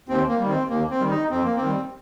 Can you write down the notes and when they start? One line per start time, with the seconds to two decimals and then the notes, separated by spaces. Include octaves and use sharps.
0.09 D#2 C4
0.28 A#3
0.39 D#3 G3
0.49 C4
0.69 D#2 A#3
0.90 C4
1.00 D#3 G3
1.10 D#4
1.30 F2 C4
1.43 A#3
1.56 D#3 C4
1.65 G3